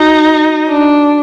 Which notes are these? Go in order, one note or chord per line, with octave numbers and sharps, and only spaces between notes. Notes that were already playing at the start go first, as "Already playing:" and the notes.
Already playing: D#4 F#4
D4